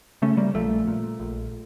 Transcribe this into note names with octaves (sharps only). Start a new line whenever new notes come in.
C#3 A3 C#4
G3 A#3
A#1 F3 A3
A#2
A#1